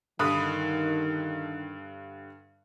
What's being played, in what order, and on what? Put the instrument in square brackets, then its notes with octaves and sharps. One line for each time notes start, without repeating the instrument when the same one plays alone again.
[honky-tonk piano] G2 D3 [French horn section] D#3 [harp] B5 D#6 F#6